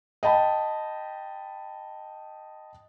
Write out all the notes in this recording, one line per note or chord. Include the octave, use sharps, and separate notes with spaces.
D#5 G5 A5 B5